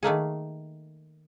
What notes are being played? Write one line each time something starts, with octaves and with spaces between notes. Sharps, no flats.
D#3 A3 A#3 G#4